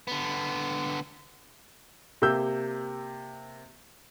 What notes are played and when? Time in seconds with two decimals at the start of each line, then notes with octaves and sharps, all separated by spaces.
0.07 D3 B3
2.22 C3 A#3 E6 G6